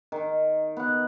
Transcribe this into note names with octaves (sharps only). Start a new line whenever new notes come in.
D#3
B3 F#5